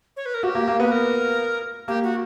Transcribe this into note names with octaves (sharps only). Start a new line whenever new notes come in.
C#5
B4
A#4
F#4 G4
A#3
A#3
B3 B4
A#4
A#3 G4
F#4